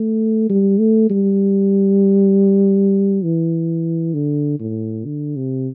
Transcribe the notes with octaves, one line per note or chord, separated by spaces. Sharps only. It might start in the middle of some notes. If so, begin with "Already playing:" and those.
Already playing: A3
G3
A3
G3
E3
D3
A2
D3
C3